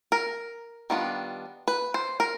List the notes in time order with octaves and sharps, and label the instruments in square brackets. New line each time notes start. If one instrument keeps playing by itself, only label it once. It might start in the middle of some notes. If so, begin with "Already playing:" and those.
[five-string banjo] A#4
D#3 G3 B3 D4 F4
B4
C5
A#4